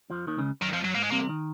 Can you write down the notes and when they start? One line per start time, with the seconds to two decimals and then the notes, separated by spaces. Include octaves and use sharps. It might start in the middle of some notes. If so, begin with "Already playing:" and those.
0.10 F2 F3
0.27 D#2 D#3
0.38 C#2 C#3
0.61 F#2 D#3
0.73 F2 F3
0.84 F#2 F#3
0.95 G#2 A#3
1.03 G#3
1.11 C2 C3 A#3
1.29 D#3